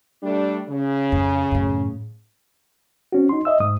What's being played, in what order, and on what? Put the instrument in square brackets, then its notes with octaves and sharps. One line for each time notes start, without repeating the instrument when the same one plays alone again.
[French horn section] G3 A3 D4
C#3
[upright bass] F2
F#2 A2
[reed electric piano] C4 C#4 F#4
D#4 C6
D#5 E5 E6
G#2 D#6